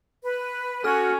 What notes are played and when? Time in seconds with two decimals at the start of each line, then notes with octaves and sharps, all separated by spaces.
0.24 B4
0.84 C#4 F#4 A4 F6